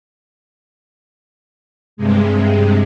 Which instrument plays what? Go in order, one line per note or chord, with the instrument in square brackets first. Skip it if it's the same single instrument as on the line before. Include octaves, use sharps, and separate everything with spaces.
[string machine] G2 C3 G#3